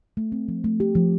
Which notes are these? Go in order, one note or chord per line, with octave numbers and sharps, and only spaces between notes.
A3
C4
F3
A3
G4
F3